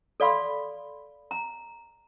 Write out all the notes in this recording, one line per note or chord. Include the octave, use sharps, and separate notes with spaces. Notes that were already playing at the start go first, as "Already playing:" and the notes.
A4 D5 F5 B5 C6
A#5